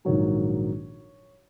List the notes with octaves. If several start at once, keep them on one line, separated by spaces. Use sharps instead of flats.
A#1 G#2 D#3 F#3 C#5